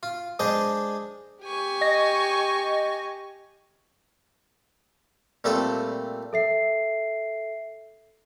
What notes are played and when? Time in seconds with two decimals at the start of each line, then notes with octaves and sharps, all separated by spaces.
0.03 F4
0.39 G#3 D4 G#4 C5 D#5
1.43 G4 G#5 C#6
1.81 D#5 A#6
5.44 A#2 G3 A3 C4 F4 A4
6.33 A4 E5 C7